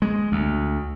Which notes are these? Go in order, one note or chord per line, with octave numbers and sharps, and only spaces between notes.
G#3
D2